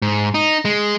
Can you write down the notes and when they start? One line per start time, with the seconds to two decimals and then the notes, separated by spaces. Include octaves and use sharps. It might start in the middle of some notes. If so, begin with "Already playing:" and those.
0.02 G#2
0.34 D#4
0.65 G#3